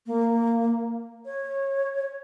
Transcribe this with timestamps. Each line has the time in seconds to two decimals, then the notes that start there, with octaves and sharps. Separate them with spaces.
0.07 A#3
1.25 C#5